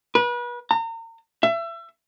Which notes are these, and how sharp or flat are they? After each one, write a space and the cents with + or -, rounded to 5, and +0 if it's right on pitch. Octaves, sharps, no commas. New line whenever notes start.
B4 -35
A#5 -35
E5 +30